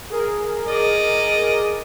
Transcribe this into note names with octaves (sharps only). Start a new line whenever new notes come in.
G#4 A#4
D5 D#5